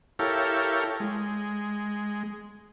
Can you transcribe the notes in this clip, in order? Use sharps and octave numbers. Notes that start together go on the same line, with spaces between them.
E4 G4 A4 A#4 C#5 F5
G#3